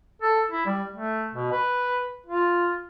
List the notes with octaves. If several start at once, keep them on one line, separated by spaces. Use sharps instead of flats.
A4
E4
G3
A3
B2
B4
F4